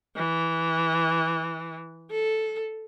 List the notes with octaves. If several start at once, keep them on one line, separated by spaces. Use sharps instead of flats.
E3
A4